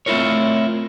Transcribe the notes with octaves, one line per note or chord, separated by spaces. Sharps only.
A3 C4 E4 F4 A#4 C#5